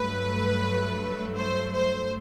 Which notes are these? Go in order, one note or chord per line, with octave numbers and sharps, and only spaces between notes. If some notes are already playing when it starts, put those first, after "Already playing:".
Already playing: G2 F#3 A3 B4
C5
C5